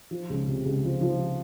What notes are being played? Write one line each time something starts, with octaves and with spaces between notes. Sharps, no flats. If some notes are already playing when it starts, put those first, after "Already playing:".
F3
C#2
C3
C#2
F3
F3